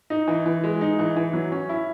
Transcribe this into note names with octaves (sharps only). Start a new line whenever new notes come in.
D#4
E3
E3
G#3
D#4
E3
E3
F#3
C#4
E4